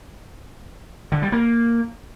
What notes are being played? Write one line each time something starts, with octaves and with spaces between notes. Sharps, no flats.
D3
G3
A#3